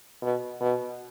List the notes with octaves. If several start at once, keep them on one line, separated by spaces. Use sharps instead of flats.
B2
B2